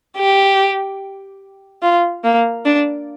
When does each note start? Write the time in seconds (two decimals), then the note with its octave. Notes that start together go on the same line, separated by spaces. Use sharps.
0.18 G4
1.82 F4
2.24 A#3
2.65 D4